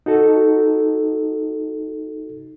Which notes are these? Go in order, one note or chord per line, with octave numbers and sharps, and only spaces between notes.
D#4 F#4 A4